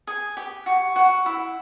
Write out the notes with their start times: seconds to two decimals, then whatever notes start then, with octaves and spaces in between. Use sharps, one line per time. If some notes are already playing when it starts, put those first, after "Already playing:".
0.07 G#4
0.37 G4
0.66 F#4
0.96 F#4
1.26 E4